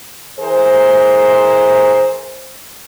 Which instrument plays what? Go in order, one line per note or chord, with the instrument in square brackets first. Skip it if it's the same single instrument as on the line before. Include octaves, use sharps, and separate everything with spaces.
[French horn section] E3 G#4 A#4 C5